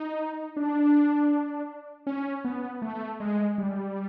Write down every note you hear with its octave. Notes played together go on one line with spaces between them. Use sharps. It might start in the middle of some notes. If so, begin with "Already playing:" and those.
Already playing: D#4
D4
C#4
B3
A3
G#3
G3